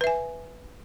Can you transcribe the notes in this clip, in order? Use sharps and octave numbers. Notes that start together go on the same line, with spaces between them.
B4 E5 G#5